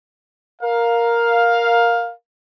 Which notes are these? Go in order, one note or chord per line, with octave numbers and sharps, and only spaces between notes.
A#4 F5